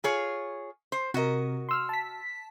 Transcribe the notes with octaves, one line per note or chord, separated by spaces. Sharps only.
F4 G#4 C#5
C5
C3 F#4 A#4 D#5
C6 E6 F6
A5 B6